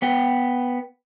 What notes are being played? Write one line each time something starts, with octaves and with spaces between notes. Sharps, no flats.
B3 B4 G5